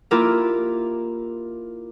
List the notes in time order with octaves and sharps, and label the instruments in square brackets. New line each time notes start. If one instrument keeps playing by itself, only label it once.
[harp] A#3 E4 F4 G4 A#4